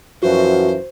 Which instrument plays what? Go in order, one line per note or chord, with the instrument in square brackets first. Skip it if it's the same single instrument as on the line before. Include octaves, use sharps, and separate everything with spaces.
[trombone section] F#2 E3 F3 [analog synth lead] F#4 [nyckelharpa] C5